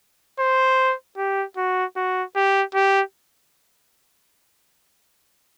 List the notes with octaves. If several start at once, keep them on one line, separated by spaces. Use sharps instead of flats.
C5
G4
F#4
F#4
G4
G4